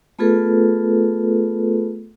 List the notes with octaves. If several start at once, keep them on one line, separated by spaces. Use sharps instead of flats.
A3 B3 F4 G#4 A4 B4